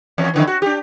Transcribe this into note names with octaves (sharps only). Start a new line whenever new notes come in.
E2 C#4
F2 D3 E3
F#4
D4 G4